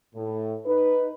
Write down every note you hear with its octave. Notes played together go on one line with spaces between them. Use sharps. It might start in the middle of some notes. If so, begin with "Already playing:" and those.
A2
D#4 B4